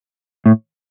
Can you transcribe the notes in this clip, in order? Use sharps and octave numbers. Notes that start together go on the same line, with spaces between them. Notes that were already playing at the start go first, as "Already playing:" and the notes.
A2